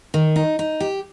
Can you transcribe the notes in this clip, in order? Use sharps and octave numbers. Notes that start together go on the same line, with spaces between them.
D#3
D#4
D#4
G4